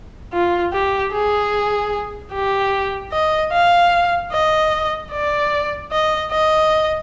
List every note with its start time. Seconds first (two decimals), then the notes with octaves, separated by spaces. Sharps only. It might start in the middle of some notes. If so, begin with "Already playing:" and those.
0.33 F4
0.73 G4
1.13 G#4
2.33 G4
3.12 D#5
3.52 F5
4.32 D#5
5.12 D5
5.91 D#5
6.31 D#5